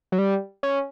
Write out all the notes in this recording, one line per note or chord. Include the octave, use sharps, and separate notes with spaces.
F#3
G3
C#4